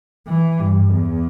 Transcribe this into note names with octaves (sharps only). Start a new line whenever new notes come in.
E3
G2
E2